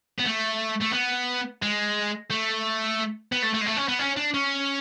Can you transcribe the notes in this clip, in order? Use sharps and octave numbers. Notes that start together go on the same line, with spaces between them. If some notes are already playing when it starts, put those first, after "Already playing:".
B3
A3
A3
B3
G#3
A3
B3
A3
A3
G#3
A3
C#4
B3
C#4
D4
C#4